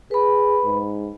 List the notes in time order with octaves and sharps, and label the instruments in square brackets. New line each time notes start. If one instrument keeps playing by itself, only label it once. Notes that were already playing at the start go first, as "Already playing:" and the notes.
[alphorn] G#4 [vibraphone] B4 B5
[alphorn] G#2